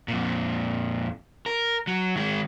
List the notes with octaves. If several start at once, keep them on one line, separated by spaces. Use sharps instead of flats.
F2 A#2
A#4
F#3
D#3 G#3